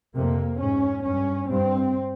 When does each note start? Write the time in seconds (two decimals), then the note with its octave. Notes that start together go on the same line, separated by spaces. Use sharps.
0.15 F2 C3 A#3
0.60 G#2 C#4
1.06 G2 C#4
1.50 G2 C4